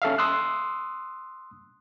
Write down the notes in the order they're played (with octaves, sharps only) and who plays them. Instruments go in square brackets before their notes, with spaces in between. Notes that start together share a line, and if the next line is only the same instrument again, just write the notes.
[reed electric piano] C#4 A4 E5 F5
C6 D#6 E6 F#6